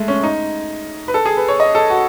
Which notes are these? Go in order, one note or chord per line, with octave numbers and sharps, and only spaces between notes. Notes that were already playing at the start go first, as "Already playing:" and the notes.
Already playing: G#3 A3
C#4
D#4
B4
A4
G#4
B4
C#5
D#5
A4
F#4